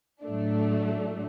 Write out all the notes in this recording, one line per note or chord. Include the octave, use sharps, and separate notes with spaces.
A2 F#3 A3 D4